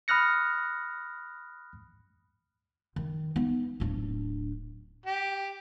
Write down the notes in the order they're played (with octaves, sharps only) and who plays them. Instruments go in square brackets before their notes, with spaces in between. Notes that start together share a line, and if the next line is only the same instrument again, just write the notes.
[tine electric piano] B5 D#6 F6 F#6 A#6 C#7
[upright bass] D#3
B3 D#4
D1 D4
[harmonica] G4